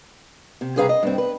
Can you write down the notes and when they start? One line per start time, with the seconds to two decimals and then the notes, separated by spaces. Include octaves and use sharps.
0.61 C3
0.76 G2 C3 G#4 B4 F5 A#5
0.89 D#5
1.03 G2 C4
1.18 B4